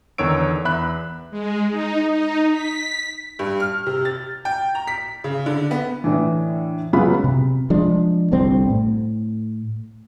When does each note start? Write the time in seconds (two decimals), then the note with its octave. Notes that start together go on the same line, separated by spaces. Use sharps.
0.18 E2 D3 D#3 C#5 E6 D7
0.65 E2 E5 B5 F#6
1.31 G#3
1.70 D#4
2.13 D#4
2.52 B6
3.39 G2
3.60 F6
3.86 C3
4.05 A6
4.45 G5
4.75 A#5
4.87 B6
5.24 C#3
5.46 D3
5.71 B3
6.04 A2 D3 E3
6.93 C#2 F#3 B3 C#4 F4 B5
7.24 C3
7.70 F3 G#3 D4
8.31 G1 C2 D3 C4
8.70 A2